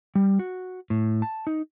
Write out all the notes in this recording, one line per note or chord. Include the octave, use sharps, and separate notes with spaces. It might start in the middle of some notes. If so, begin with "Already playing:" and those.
G3
F#4
A2
A5
D#4